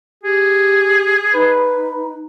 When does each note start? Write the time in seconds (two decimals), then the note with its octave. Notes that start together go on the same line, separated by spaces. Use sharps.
0.23 G4 G#4
1.34 D#4 B4